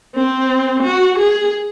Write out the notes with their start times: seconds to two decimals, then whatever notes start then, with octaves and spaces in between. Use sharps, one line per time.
0.15 C4
0.84 F#4
1.18 G#4